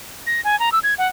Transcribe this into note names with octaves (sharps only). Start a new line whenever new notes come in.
A#6
G#5
A#5
E6
G#6
F#5